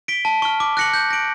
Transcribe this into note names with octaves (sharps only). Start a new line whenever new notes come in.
B6 D7 G7
A5
C#6 F6
D6
F#6 A#6 C#7 F#7
G6
A#6 D7 F#7